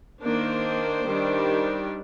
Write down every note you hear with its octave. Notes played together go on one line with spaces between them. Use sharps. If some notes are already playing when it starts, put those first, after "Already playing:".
D#3 A#3 D4 C5
D#3 G3 D4